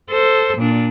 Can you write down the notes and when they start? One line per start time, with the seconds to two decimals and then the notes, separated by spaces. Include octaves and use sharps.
0.11 A4 C5
0.58 A#2 D4